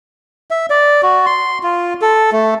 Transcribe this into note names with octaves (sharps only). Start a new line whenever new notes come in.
E5
D5
F#4
C6
F4
A4
A3